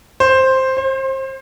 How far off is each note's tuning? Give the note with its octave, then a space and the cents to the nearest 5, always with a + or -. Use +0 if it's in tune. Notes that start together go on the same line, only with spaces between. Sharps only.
C5 +5
C5 +30